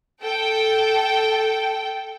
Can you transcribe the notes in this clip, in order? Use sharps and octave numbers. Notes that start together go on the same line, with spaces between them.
A4 G5